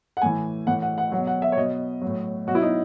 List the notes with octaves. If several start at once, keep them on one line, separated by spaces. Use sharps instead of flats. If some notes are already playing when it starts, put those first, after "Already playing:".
F#5
A2 E3 G#5
A2 E3 F#5
F#5
F#5
B2 F#3 F#5
F#5
E5
C#5
B2 F#3 D#5
A2 F#3
B2 F#3 F#4
E4
D#4